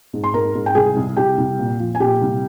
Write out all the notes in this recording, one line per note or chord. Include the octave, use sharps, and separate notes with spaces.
G#2
C6
G#2 A#4 A#5
G#2
G5
C2 G#4 G#5
C2
C2 G4 G5
C2
A#2
F3
G#5
A#2 G4 G5
C2